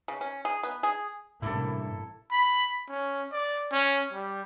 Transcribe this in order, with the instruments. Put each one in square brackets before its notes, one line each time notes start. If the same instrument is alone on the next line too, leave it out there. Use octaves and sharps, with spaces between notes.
[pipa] C#3
C#4
G#4
B3
G#4
[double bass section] A1 C3 A#3 [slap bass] G2 [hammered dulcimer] E4 A4
[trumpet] B5
C#4
D5
C#4
G3